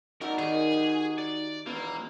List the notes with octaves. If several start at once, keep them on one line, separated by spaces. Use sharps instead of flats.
D#4 F#4 A#4 D5 E5 G5
D#3 G4 G#4
G4 G#5 B5
D5
B2 E3 A#3